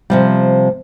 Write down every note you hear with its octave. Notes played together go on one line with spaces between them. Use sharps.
C3 F3 G3